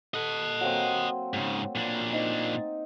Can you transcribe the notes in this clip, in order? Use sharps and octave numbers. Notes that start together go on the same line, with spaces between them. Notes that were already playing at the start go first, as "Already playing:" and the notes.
A4 D#5 F#5
F#3 A#3 C4
G#2 C#3
A#2 D4
C4 D#4